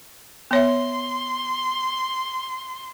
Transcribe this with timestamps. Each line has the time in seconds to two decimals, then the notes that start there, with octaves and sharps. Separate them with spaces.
0.51 B3 C#5 E5 C6